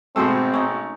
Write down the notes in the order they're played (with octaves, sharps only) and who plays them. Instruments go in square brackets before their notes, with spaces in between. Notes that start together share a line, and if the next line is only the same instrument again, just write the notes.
[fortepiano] G#1 B2 E6 [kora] A3 G#4 C5 [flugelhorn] C4
[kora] C#4 D#4